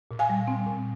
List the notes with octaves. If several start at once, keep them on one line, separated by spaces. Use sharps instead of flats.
A#2
F5 G#5
G3
C4
A#2